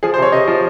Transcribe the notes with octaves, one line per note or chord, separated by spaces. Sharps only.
F3 G#4
C5
C3 C#5
C3 D#5
F3